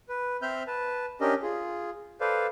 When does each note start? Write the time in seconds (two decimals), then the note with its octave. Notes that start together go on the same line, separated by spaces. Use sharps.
0.09 B4
0.42 C4 C5 E5 F6 G6
0.67 B4 A5
1.21 C#4 D4 G4 A#4 D#5
1.43 F4 G#4
2.21 A4 B4 C5 D5 F5